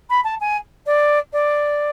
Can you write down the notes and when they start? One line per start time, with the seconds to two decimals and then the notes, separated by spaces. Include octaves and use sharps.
0.09 B5
0.24 A5
0.40 G#5
0.86 D5
1.32 D5